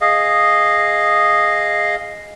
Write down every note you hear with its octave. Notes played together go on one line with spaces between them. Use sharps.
G#4 D#5 F5